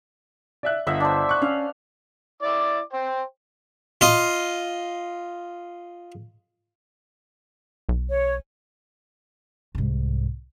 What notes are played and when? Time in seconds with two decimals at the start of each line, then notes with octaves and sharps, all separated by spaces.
0.63 D5 E5 F#6
0.87 G1 D#5 E5 F#5
1.00 D4 C5
1.29 C#6 F#6
1.42 C#4 F5
2.43 E4 D5 D6
2.93 C5 G5
4.01 F4 D#5
7.89 B1
8.10 C#5
9.75 C2 G#2